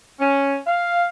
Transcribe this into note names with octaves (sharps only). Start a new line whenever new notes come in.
C#4
F5